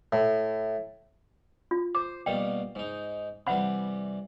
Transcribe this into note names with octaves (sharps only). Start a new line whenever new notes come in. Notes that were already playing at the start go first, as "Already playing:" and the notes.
A2
F4
C5 D6
B2 G3 A#3 G5
G#2 D#4
C3 E3 G3 F#5 B5